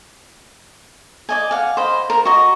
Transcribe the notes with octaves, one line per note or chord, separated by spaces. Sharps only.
D5 D#5 G#5
F5 F#5
C5 D#5 B5
A#4
F#4 D#5